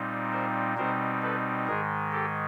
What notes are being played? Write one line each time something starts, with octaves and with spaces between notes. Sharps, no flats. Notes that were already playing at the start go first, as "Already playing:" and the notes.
Already playing: A#2 G3 C4 D#4
A#4 C5
B2 G3 C4 D#4 A#4 C5
A4 B4
G#2 D#3 G#3 G#4 A#4
G4 A4